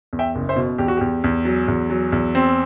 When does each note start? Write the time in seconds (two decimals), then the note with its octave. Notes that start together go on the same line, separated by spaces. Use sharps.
0.13 E2
0.19 E5 G5
0.35 F#1
0.49 C5 E5
0.56 B2
0.78 E2 G4
0.88 F#4
0.97 E2 G4
1.24 E2
1.45 F#3
1.68 E2
1.90 F#3
2.12 E2
2.35 C4